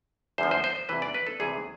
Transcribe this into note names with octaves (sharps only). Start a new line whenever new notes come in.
E2 D3 F3 C5
C5
C5
C5
E2 C3 E3 B4
D5
B4
A4
D2 C3 E3 G#4